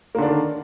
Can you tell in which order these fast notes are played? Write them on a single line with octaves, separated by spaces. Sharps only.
A#3 D3 D4 D#3